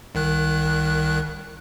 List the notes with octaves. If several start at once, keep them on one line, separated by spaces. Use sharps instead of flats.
C2 D#3 F#6